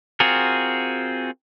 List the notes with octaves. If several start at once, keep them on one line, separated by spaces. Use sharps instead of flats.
C4 F4 F#4 G#4 A#4